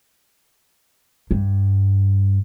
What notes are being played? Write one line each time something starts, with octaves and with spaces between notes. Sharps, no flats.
G2